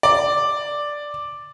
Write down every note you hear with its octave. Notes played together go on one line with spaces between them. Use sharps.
D5